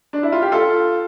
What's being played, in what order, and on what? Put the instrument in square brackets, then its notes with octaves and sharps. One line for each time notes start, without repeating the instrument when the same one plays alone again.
[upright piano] D4
E4
F4
G4
F4 A4